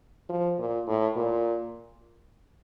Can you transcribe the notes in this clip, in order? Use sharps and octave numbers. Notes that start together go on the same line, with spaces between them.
F3
A#2
A2
A#2